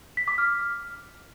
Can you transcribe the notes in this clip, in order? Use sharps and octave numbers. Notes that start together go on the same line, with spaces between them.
B6
D6
F6